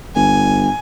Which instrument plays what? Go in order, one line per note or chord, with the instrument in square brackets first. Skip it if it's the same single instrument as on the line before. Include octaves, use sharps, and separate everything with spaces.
[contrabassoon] G1 [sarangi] G#5